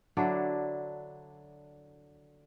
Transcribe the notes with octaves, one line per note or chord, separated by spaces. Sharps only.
D3 F#3 D4 E4